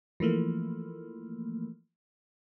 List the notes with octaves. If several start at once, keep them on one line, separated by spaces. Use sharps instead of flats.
E3 F3 A3 A#3